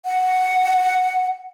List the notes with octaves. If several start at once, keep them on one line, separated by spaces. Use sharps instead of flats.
F#5